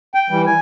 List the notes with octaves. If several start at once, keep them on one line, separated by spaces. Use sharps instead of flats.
G5
E3 G3
G#5